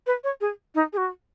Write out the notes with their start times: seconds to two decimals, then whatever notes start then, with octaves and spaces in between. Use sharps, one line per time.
0.07 B4
0.24 C#5
0.41 G#4
0.75 D#4
0.93 G#4
0.97 F#4